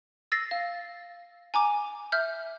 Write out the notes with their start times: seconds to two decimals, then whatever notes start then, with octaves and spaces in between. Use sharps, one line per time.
0.32 E6 A6 A#6 C7
0.51 F5
1.54 G#5 A#5 D6
2.12 E5 F6 G6